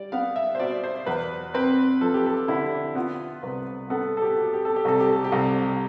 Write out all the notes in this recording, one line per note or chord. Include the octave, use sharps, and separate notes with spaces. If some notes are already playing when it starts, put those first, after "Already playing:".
Already playing: G3 D5
B3 F5
E5
C5
B2 D5
C5
E2 B4
C4 B4
F3 A4
G4
A4
D3 E4
B3 F4
C2 B4
B3 A4
A4
G4
B2
G4
A4
G4
C2 A4
G4
A4
G4
C2